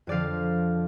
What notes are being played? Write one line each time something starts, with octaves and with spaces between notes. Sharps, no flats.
F2 D3 F3 D5 F5